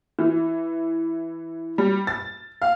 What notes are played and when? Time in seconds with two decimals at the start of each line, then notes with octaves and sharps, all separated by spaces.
0.19 E3
1.78 G3
2.07 A6
2.62 F5